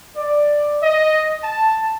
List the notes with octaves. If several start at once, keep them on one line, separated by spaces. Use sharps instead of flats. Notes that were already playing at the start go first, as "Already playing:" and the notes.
D5
D#5
A5